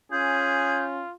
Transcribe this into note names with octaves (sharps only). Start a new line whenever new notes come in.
C#4 F4 G#4 G6